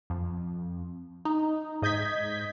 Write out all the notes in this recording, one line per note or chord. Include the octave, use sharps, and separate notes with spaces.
F2
D#4
G#2 D#5 G6 G#6 B6